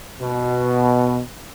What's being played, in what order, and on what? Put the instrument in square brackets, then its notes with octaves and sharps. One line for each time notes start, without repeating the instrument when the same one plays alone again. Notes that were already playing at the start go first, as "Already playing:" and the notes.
[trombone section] B2